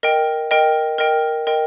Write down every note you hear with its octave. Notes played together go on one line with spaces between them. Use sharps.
A#4 D#5 G5
A#4 D#5 G5
A#4 D#5 G5
A#4 D#5 G5